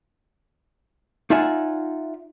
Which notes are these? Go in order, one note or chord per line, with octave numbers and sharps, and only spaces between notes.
D#4 F4 D5 E5 F#5 G#5